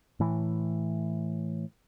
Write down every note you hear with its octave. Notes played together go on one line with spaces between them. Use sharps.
A2 E3